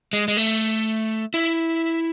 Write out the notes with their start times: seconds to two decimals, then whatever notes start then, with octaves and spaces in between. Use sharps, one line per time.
0.13 G#3
0.28 G#3
0.37 A3
1.34 E4